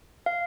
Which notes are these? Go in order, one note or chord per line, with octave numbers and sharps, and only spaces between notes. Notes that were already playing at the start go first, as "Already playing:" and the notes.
F5